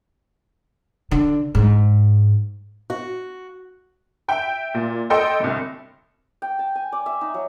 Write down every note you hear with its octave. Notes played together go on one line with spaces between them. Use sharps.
D3
G#2
F#4
E5 G5
A#2
A4 D#5 G5 C6
G1 C2
G5
A5
G#5
D5
E5
D#4
F#3